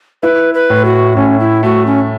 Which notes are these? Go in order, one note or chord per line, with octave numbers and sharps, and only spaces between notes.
E4 B4
B4
A2
F#4
A2 C#4
E4
A3 F#4
C#4